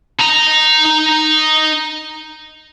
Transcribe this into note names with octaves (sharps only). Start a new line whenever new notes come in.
D#4 A#5